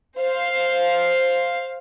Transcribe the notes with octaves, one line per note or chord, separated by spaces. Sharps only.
C5 F5